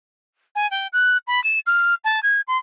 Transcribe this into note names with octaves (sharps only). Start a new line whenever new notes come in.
G#5
G5
F#6
B5
E7
F6
A5
G#6
C6